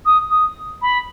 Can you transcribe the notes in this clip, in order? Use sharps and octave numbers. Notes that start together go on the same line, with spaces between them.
D#6
D#6
B5